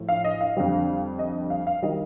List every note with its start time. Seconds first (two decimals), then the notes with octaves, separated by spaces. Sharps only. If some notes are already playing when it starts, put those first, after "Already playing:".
Already playing: A2 F3
0.09 F5
0.24 D#5
0.41 F5
0.57 F2 D3 G3
1.19 D#5
1.50 F5
1.67 F5
1.82 D#3 G3 D#5